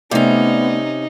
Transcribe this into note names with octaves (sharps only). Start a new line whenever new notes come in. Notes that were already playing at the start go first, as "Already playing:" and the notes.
C3 A3 B3 C#4 D#4 D5